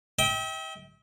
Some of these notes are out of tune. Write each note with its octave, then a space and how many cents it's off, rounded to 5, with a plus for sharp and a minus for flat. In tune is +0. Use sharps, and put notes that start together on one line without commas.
E5 -45 G5 +0